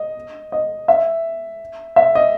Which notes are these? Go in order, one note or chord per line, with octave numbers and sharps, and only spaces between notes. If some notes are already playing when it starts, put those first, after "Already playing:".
Already playing: D#5
D#5
E5
E5
D#5